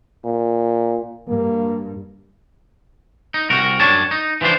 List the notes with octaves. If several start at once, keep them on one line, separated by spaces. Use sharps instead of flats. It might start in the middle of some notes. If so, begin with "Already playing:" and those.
A#2
G2 A#3
D#4
C2 F#4 A#4
F#2 D4 C#5 A5
D#4
E3 F3 C#4 D4 C5